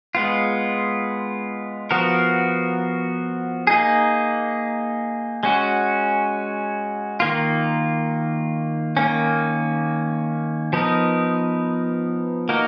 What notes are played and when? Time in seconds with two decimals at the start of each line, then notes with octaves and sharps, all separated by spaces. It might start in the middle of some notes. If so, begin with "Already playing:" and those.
0.15 G#3 B3 F4
1.91 F3 B3 F#4 A#4
3.67 A#3 D#4 G#4
5.43 G#3 C#4 F#4
7.20 D#3 A#3 F4
8.97 D#3 A#3 C#4
10.73 F3 B3 D#4 A#4
12.49 A#3 D#4 F#4 A#4